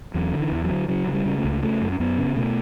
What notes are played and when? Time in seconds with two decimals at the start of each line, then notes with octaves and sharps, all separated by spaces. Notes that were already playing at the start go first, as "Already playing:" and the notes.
0.14 E2 F#3
0.33 D3
0.40 E3
0.52 E2
0.64 F#3
0.70 D3
0.88 C#3 F#3
1.07 C#3
1.13 G3
1.26 C#3
1.38 A3
1.44 C#2
1.63 C#3 A3
1.81 F#2
1.92 C#4
2.00 F#2 B3
2.18 C#3
2.36 B2 A3